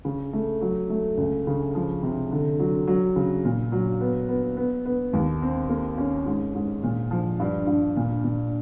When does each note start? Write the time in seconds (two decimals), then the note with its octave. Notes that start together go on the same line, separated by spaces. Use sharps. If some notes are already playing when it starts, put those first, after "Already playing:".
0.05 C#3
0.33 A3
0.61 F#3
0.90 A3
1.18 C#2
1.47 C#3
1.75 F3
2.03 C3
2.32 D3
2.59 F#3
2.87 F#3
3.16 C#3
3.45 A#2
3.72 F#3
4.01 B3
4.29 B3
4.57 B3
4.85 B3
5.13 D#2
5.42 C4
5.69 A#3
5.98 C#4
6.26 G#2
6.54 G#2
6.83 A#2
7.11 F3
7.40 G2
7.67 G2
7.96 A#2
8.24 A#2